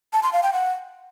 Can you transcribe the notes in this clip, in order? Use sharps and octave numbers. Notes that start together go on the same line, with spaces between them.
A5
C6
F5
G5
F#5